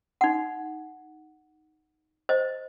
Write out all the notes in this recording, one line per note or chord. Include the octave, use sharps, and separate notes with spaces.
D#4 F#5
C5 D#5